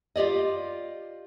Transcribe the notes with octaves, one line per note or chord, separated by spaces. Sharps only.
F4 G4 D5 D#5